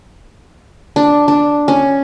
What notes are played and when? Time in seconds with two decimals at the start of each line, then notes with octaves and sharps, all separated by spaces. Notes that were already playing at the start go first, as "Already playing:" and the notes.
0.96 D4
1.28 D4
1.68 C#4